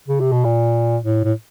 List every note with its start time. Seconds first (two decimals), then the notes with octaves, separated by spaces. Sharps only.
0.08 C#3
0.20 C3
0.32 B2
0.44 A#2
1.04 A2
1.24 A2